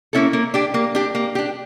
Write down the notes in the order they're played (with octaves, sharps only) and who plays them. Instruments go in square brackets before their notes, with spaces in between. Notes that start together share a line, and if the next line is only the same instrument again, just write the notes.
[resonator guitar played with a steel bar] A#3 C#4 E4 A4
A#3
D4 G4
A#3
D4 G4
A#3
D4 G4